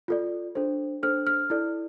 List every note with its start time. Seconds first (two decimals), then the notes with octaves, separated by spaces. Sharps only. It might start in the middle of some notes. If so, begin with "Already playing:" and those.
0.08 F4 A4 D5
0.55 D4 A4 C5
1.03 D4 A4 C5 F6
1.27 F6
1.50 E4 A4 D5